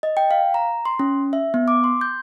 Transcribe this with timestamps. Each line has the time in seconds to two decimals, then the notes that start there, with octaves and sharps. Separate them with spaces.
0.03 D#5
0.17 G5
0.31 F5
0.54 A#5
0.85 C6
0.99 C#4
1.33 E5
1.54 B3
1.68 D6
1.84 C6
2.01 G6